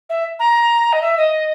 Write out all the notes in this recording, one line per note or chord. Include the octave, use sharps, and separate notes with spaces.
E5
A#5
D#5
E5
D#5